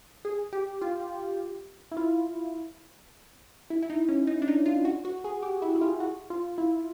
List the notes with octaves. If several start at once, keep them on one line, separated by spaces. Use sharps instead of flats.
G#4
G4
F4
E4
F4
E4
E4
D#4
C#4
D#4
D4
D#4
F4
F#4
F#4
G#4
G4
E4
E4
F4
F#4
F4
E4